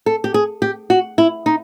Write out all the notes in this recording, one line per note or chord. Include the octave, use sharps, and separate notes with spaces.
A4
G4
G#4
G4
F#4
E4
D#4